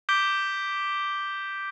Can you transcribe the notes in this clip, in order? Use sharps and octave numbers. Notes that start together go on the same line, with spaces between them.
D6 G6 B6 D7 G7